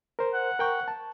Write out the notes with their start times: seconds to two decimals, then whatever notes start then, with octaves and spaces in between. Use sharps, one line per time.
0.19 A#4 C5
0.34 F#5
0.59 A#4 G5 C#6
0.88 A5